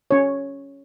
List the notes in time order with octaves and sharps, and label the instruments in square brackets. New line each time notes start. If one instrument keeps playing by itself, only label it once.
[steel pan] C#4 C#5